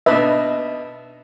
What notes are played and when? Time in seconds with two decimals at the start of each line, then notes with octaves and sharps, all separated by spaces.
0.06 B2 D4 D#4 B4 E5